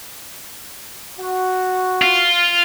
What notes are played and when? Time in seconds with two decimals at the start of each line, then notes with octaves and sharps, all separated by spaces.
1.19 F#4
2.02 F4